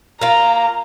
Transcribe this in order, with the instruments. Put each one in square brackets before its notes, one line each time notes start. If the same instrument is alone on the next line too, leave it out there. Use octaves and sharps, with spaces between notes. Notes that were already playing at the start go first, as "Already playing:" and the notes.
[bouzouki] A#3 F4 [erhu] A#5